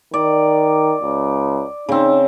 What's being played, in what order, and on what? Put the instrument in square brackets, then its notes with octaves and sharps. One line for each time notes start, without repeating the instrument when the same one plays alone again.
[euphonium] D#3 [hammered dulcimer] D5
[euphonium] C#2
[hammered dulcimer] C#3 C4 [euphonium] D#4